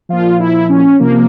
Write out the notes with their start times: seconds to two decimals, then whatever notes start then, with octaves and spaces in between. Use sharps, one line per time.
0.09 A#2 F3 F4
0.40 E4
0.70 C#4
1.00 C3 F3 A#3